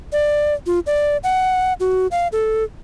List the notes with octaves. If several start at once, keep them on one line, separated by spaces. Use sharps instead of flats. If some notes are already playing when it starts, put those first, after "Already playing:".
D5
F4
D5
F#5
F#4
F5
A4